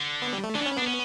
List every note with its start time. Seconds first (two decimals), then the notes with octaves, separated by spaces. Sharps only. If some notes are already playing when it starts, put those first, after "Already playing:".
Already playing: D3
0.22 B3
0.33 G3
0.44 A3
0.55 E3 D4
0.63 B3
0.66 C#4
0.76 B3 D4
0.87 C#4